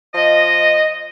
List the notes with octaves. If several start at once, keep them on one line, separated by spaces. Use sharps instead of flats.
F3 D#5